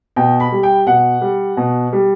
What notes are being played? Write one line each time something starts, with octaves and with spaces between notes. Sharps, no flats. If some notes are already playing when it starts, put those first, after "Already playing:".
B2 G5
B5
G3
G5
B2 F#5
G3
B2
G3